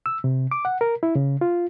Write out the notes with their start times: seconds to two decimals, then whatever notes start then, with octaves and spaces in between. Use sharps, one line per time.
0.06 E6
0.24 C3
0.51 D6
0.65 F#5
0.81 A#4
1.03 E4
1.15 C#3
1.41 F4